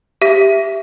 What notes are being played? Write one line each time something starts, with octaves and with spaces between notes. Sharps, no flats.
G4 E5 B6